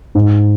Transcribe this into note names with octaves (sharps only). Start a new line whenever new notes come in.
G#2